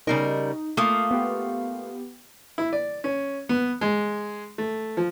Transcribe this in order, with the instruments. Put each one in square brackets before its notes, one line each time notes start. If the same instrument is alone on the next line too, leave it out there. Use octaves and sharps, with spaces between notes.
[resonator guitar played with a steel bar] C#3 G3 A#4 [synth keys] D#4
[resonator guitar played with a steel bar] A3 A#3 [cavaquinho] F4 F5 D#6
[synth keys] B3 G4
[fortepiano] E4
D5
C#4
B3
G#3
A3
F3